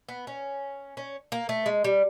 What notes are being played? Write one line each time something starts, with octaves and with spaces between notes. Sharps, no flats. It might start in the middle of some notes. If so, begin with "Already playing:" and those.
B3
C#4
C#4
A#3
A3
G#3
G3